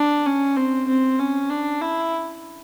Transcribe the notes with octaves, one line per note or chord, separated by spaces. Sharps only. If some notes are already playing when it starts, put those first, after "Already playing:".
Already playing: D4
C#4
C4
C4
C#4
D4
E4